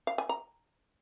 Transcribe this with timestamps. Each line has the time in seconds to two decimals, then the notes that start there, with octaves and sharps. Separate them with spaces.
0.07 F5
0.18 G#5
0.29 A#5